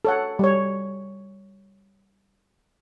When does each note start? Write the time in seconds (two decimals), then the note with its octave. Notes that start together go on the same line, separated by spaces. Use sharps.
0.05 A4 C#5 F#5
0.39 G3 C#5